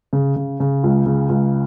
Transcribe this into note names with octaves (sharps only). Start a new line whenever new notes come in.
C#3
C#3
C#3
C#2
C#3
C#2